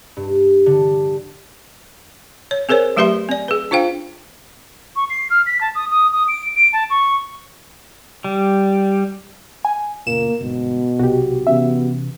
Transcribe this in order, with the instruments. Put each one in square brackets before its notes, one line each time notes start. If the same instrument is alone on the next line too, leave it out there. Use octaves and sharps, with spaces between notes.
[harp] G2
D3
[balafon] C#5
C4 G#4 A#4 C5 C#5
F#3 A3 G4 B4 E5 C6
C4 D5
G#4 B4
D4 F4 C5 F5 G5
[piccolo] C#6
C7
F6
B6
A5
D#6
D#6
D#6
D7
D7
A5
C#6
[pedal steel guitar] G3
[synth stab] G#5
[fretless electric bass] F#1 A#2 [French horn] A#3 [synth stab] E7
[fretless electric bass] G1 G#2 [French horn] B2
[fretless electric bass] B1 C3 [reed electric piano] F#4 G4
[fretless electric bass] C3 E3 C#4 [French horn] B3 [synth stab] E5